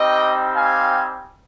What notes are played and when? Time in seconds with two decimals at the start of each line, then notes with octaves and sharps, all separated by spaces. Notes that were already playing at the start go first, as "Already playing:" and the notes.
Already playing: G3 C4 D#4 G4 D#5 G5
0.55 F5 G#5